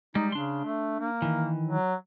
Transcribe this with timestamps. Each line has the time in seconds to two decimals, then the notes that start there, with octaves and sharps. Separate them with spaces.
0.15 G3 G#3 D#4
0.32 C#3 D4 C6
0.64 A3
1.00 A#3
1.22 D#3 E3
1.67 F#3